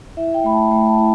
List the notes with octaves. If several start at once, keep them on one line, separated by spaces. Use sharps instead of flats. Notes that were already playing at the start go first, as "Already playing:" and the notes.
E4 E5
G5
A3 B5
A5
A3 G5
A5
E4